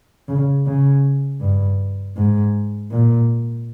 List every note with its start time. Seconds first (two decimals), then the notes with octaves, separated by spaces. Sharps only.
0.28 C#3
0.66 C#3
1.41 G2
2.17 G#2
2.91 A#2